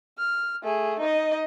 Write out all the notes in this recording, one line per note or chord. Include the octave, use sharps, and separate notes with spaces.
F6
A3 G#4
D#4 D#5